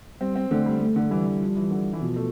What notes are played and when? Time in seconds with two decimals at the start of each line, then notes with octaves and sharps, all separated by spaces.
0.21 G3 C4
0.36 C4
0.50 D3 A3
0.66 G3
0.81 A3
0.96 D3
1.11 E3 G3
1.26 E3
1.41 F3
1.56 E3
1.71 D3
1.93 E3
2.01 B2 F3
2.16 A3